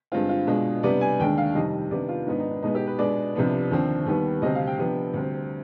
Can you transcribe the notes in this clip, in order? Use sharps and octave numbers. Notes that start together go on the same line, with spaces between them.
G2 D3 G#3 C4 F4
F4
B2 G#3 D4
C3 G3 B3 D4 D5
G#5
D#2 D3 G#3 D4 G5
F5
F2 C3 D#3 G3 D#5
C3 D#3 B3 D4 D5
F4
G#2 D#3 B3 D4 D#4
D#4
D4
B2 G#3 B3 D#4
G4
B4
B2 G#3 B3 D4 D5
C2 C3 F3 B3 D4
D#2 D3 F3 C4
D#2 D#3 G3 B3
D2 C3 G3 C4 D#5
F5
G5
C3 F3 B3 D4
D2 D3 G3 C4